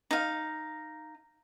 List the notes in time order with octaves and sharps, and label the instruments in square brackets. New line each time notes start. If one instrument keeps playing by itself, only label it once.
[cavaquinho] D#4 F5